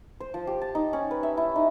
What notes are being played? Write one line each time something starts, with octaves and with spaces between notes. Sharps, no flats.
C5
F3
G4
A5
D#4
C#4
B4
E5
E4
D#4